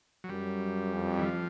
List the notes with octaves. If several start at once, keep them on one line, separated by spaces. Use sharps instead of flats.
F#3
F#2 G3
F2
E3
F3